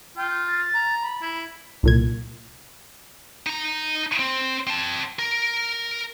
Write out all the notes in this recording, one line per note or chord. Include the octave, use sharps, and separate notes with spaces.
F4 G5
G6
A6
A#5
B5
E4
C2 A#2 G#6
D#4 A#5
C4
C4 A5
A#4